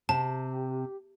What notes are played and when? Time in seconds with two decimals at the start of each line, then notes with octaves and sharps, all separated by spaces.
0.09 C3 G4 A5